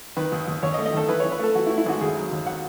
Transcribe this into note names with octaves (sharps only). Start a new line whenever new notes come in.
D#3 B4
D#2
D#2
D#2 C#5
D#5
A3
D#5
D#3 A4
E3 B4
C#5
E3
B4
A3 A4
E3 F#4
E4
A3
E4
G#1 F#4
D#2 G#4
F#3
D#2
F#5